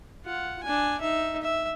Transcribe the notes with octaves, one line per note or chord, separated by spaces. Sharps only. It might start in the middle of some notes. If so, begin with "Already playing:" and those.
F4 F#5
D4 G#5
D#4 E5
E5